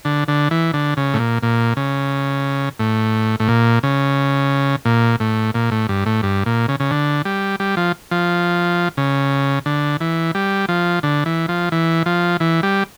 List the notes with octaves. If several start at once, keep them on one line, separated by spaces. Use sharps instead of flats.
D3
D3
E3
D3
C#3
A2
A#2
A#2
C#3
A2
A2
A#2
C#3
A#2
A2
A#2
A2
G2
A2
G2
A#2
C#3
C#3
D3
G3
G3
F3
F3
C#3
D3
E3
G3
F3
D3
E3
F3
E3
F3
E3
G3